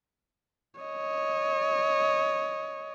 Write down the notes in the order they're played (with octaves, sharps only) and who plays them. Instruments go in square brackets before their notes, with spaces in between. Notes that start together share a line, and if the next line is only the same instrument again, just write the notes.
[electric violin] C#5 D#5